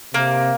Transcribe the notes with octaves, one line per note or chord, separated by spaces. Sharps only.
C3 A#3